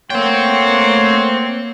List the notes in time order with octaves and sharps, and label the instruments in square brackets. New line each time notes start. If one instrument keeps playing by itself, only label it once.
[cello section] A3 A#3 [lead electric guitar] C5 G5 [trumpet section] C#5 F#5 C6